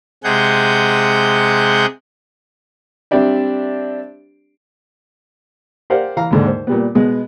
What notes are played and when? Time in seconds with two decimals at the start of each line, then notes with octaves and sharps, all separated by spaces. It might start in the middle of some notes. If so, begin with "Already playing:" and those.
0.24 C3 G#3 G#4 F#5 G6
3.11 G3 C4 D4 G4 D5 E5
5.90 G4 A#4 C5 D5 F5 F#5
6.17 E3 F5 A#5
6.31 D#2 G#2 D3
6.47 C5
6.67 A#2 G3 B3
6.95 B2 G#3 B3